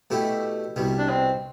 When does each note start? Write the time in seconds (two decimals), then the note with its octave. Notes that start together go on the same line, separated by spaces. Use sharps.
0.10 B2 A3 E4 G4
0.76 C2 B2 G3
0.99 D4
1.10 C4